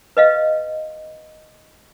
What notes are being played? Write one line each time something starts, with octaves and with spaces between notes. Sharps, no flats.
B4 D#5 F5